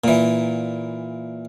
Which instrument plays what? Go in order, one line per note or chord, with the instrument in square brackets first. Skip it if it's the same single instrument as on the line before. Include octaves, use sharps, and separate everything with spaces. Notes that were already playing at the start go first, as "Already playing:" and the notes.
[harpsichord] A#2 E3